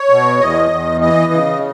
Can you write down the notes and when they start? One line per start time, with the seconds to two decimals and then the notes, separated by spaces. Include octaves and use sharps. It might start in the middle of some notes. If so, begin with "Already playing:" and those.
Already playing: C#5
0.10 B2
0.40 E2 D#5
0.71 E2
1.01 E3 D#5
1.33 C#3